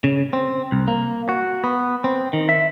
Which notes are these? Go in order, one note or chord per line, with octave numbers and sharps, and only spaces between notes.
C#3
C4
C2
A#3
F#4
B3
C4
D#3
E5